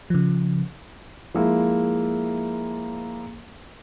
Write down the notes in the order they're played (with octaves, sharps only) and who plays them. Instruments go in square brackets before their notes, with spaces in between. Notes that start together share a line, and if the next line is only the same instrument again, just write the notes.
[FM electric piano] C#3 F3
[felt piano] F3 G#3 A#3 E4